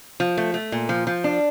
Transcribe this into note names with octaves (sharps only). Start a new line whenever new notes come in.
F3
A3
A3
A#2
F3
F3
D4